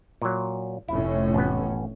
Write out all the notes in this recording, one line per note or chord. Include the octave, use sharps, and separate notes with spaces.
A#2 F#3
F1 A2 C#4 E4
A1 B3